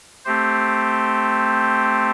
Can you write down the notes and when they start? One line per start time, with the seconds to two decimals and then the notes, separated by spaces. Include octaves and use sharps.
0.25 A3 C4 G4 C5